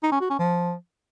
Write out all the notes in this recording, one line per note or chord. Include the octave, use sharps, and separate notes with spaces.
D#4
C#4
F#4
C#4
F3